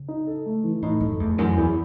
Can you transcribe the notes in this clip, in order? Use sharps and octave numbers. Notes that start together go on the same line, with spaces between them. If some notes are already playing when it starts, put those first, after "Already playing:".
Already playing: C#3
D#4
A4
A3
E3
A2 D#4
F#2 A4
E2 A3
F#2 E3
E2 E4